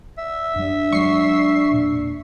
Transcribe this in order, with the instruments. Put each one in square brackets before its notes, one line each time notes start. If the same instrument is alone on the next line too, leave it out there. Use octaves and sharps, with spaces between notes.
[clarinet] E5
[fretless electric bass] F#2 G3 [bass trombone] D4
[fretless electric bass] F#3 G#3 [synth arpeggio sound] C#6 C7
[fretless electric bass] E1 A#2